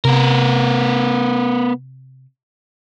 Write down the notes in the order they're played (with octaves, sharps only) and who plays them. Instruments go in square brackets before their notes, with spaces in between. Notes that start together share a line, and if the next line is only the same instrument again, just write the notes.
[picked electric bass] C3 [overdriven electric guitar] B3 A#4